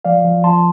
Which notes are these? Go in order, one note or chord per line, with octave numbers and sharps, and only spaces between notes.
F3 D5 F5
F3
F3 A5 C6